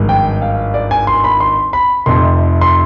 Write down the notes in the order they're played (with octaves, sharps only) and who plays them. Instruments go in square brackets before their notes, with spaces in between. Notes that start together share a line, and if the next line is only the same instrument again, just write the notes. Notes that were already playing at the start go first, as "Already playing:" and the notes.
Already playing: [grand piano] G#1 G2 F3 G#3
G5
F5
D5
G#5
C6
B5
C6
B5
F1 F2 C3 C6
C6